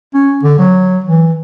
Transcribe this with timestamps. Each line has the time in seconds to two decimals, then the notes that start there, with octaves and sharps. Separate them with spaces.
0.14 C#4
0.43 D3
0.59 F#3
1.04 E3